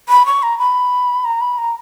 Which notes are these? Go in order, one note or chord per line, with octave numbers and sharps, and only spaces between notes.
B5
C#6
A#5
B5
A#5
B5
A#5